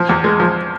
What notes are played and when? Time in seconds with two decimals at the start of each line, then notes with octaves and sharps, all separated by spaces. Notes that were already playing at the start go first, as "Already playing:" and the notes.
Already playing: F3
0.09 E2
0.24 G#3
0.40 F3